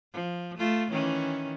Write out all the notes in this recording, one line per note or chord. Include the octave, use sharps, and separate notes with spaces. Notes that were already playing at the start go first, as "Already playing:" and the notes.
F3
A3 F4
D#3 E3 C#4